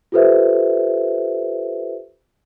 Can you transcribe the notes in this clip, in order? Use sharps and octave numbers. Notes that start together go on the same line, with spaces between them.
F4 G4 A4 B4 C5 E5